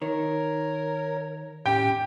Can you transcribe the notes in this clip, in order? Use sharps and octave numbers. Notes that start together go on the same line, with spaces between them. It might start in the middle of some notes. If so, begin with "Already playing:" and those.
D#3 A#4 C#5
A2 C#4 G4 G5